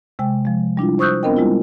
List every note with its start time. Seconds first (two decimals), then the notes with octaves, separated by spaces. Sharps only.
0.19 C3 G#3 G5
0.45 F3 G#3
0.77 G3 D4 E4 F4
0.99 C5 C#6 D#6 E6 F#6 G6
1.23 B3 C4 D4 A#4 D#5 G5
1.37 G3 G#3 E4 F4